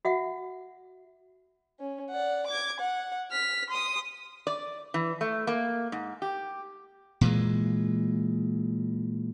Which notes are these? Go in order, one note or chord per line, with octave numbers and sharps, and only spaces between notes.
F#4 E5 F#5
C#4
D5 F#5
D6 G#6
F#5
F6 B6
C6 D#6
D5
E3
A3
A#3
G#2
G4
A#2 E3 G#3